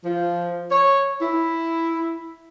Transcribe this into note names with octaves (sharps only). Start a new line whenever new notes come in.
F3
C#5
E4